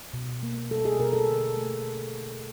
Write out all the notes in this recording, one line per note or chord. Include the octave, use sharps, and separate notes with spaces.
B2
A#3
G3 A4
G#4
B2 A#4
A4
D3
A3